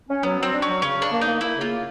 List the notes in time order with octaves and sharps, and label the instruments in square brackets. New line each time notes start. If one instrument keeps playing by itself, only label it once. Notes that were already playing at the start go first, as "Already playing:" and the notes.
[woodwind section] C#4
[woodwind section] F#3 [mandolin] B3
[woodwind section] F#3 [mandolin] C4
[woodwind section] D4
[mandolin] C#4
[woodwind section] F#3
[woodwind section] C#3 [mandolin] C#4
[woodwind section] C#3
[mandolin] D4
[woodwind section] A#3
[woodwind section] A#3 [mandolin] D#4
[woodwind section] A#3 [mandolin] E4
[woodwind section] C#3 [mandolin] F4
[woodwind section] A#3